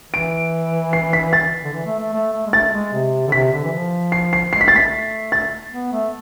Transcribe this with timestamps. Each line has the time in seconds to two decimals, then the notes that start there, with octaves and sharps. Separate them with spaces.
0.13 E3 D7
0.93 C7
1.13 B6
1.33 A6
1.65 D3
1.74 E3
1.86 A3
1.99 A3
2.13 A3
2.33 A3
2.47 G#3
2.53 A3 A6
2.73 G#3
2.93 C3
3.28 D3
3.32 C3 B6
3.53 D3
3.64 E3
3.72 F3
4.12 C7
4.33 C7
4.53 G#3 C7
4.61 B6
4.68 A6
4.73 A3 B6
5.32 A6
5.72 B3
5.93 A3